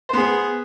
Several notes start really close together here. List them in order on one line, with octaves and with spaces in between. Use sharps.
C5 B3 G#4